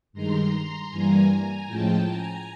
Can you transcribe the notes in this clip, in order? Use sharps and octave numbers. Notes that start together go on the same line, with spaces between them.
G2 D#3 G#3 A#5 C6
G2 E3 G3 A#3 G#5 A#5
A2 F3 G#3 C#4 G5 A5
G#5 A#5